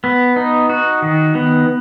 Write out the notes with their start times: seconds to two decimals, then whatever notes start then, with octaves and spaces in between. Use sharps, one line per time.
0.04 B3
0.36 D#4
0.69 F#4
1.02 D#3
1.35 B3